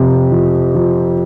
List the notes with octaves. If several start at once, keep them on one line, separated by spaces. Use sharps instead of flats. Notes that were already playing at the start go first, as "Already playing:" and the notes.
Already playing: F2 C3 F3
F3
F3